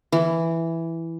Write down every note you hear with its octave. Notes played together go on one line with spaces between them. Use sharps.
E3